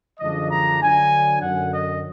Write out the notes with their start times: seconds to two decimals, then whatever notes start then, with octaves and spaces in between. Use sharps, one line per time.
0.20 F#2 D3 F3 G#3 D4 D#5
0.51 A#5
0.81 D3 F#3 D4 G#5
1.42 F#2 D3 F#3 F#5
1.72 D#5